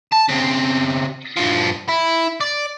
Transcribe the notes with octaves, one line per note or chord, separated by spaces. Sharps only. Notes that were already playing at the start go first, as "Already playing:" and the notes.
A5
C#3 C4
G2 F3
E4
D5